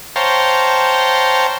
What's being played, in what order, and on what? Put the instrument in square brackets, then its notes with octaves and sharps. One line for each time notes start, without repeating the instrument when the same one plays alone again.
[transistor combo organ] C5 C#5 F5 G5 A5 A#5